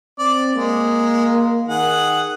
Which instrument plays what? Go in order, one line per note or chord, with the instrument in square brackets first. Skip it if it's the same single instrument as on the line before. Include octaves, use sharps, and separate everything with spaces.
[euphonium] C4 [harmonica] D5
[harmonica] G#3 [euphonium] A#3
[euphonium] D#3 [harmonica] G#4 F#5